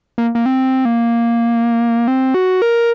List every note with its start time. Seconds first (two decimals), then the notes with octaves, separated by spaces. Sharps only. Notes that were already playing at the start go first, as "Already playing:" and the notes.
0.18 A#3
0.35 A#3
0.46 C4
0.85 A#3
2.08 C4
2.34 F#4
2.62 A#4